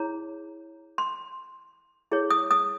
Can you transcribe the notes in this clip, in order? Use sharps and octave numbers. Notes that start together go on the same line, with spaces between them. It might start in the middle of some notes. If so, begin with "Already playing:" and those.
Already playing: E4 G#4 C#5 A#5
C6
E4 G#4 C#5
D#6
D#6